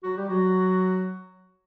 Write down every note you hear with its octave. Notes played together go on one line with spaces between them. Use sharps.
F#3 F#4
G3 G4
F#3 F#4